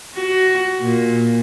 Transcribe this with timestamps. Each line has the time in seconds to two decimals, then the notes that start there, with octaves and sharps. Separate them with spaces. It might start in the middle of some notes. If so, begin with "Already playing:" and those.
0.16 F#4
0.81 A#2